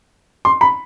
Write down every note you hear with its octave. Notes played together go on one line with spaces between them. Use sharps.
C6
B5